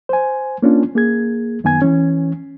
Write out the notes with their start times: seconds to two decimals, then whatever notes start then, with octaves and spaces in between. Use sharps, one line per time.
0.09 C5 G#5
0.62 A#3 C#4 D4 F4
0.95 A#3 G#4 G#6
1.64 F#2 D#3 B3 G#5 G#6
1.82 E3 C#4